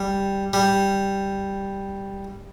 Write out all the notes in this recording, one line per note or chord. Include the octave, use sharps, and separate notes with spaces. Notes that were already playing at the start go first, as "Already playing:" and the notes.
Already playing: G3
G3